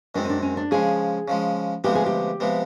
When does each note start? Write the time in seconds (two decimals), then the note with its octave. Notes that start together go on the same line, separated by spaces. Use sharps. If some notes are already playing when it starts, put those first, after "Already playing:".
0.15 F#2 D#3 G#3 C4 D4
0.25 C#4
0.30 D4
0.43 C#4
0.57 D4
0.71 C#3 F3 G#3 G#4
1.28 C#3 F3 G#3
1.84 D2 C3 F3 G#3 B3 G4
1.95 G#4
2.06 G4
2.40 C3 F3 G#3 B3